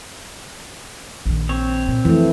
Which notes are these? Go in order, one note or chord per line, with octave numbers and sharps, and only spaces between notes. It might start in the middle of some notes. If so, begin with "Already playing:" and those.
A#1 D#3
C4 C#5
C2 A#2
C2 F2 E3 A3